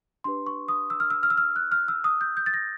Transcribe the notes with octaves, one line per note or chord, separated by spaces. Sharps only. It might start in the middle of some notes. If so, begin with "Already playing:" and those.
D4 G4 B4 C6
C#6
D#6
E6
F6
E6
F6
E6
F6
F#6
F6
E6
D#6
G6
G6
A6
A#6